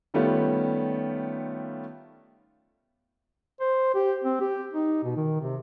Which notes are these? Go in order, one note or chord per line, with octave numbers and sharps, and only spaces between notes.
D#3 G3 A3 B3 C#4 F4
C5
G4
C4
G4
D#4
B2
D#3
C3